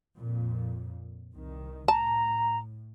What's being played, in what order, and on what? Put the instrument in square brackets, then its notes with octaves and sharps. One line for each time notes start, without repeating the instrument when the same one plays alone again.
[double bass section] F2 A#2
C2 D#3
[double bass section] A2 [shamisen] A5 [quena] A#5